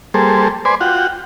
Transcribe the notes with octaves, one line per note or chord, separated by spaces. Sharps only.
G3 A#3 G#4 A4 C5
B4 C5 D5 G#5 C6
F4 F#4 F#5 G5